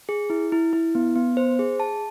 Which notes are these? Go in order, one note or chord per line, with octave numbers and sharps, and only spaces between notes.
G#4
E4
E4
E4
B3
B3
C5
G#4
A5